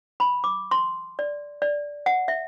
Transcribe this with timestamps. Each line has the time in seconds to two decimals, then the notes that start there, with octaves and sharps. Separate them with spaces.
0.20 B5
0.44 D6
0.71 C6
1.19 D5
1.62 D5
2.06 F#5
2.28 E5